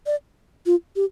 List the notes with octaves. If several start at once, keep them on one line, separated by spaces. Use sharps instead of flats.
D5
F4
G4